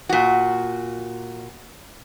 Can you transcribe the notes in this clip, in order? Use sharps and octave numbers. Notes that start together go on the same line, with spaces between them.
A#2 F#4